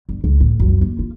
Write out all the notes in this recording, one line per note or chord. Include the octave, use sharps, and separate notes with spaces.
G1
C#2 D#3
A2
C2 F#2
D#2
F4